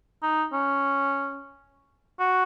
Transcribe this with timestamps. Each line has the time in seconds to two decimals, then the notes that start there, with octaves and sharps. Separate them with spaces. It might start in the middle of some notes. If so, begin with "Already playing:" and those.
0.23 D#4
0.53 C#4
2.20 F#4